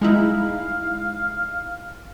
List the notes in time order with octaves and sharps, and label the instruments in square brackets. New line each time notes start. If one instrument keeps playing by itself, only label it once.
[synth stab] G#3 D#4 E4 [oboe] F5